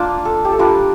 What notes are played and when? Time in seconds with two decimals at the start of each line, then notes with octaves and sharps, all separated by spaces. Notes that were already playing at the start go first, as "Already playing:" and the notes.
Already playing: A#3 D4 F4
0.25 A4
0.45 G4
0.52 A4
0.59 G3 D4 F4 A#4